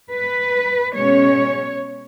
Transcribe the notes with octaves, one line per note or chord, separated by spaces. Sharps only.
B4
B2 G#3 C#4 C#5